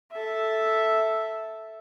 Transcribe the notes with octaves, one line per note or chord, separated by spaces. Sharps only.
A4 E5